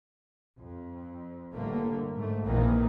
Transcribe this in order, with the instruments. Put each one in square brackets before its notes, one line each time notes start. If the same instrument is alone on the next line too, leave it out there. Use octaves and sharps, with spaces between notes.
[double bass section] F2
G1 A2 D3 A3 A#3
G#2 A3
A#1 F2 A#2 D#3 E3 A#3